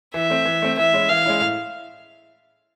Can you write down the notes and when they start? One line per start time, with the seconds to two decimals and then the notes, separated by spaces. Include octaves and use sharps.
0.14 E3 E5
0.30 A3 C4
0.45 E3
0.62 A3 C4
0.77 E3 E5
0.94 G#3 C#4 E4
1.09 E3 F5
1.25 G#3 C#4 E4
1.41 A2